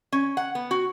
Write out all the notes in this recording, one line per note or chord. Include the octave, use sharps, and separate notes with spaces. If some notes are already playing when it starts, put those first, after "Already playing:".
C#4
F#5
B3
F#4